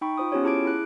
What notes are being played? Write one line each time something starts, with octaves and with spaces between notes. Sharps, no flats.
D#4 G5 B5 C#6
F4 C5 D#6
B3 C#4 F4 G4 C#5
E4 G#4 A5 D6 G#6 D7
E4 G#4 F#6 D7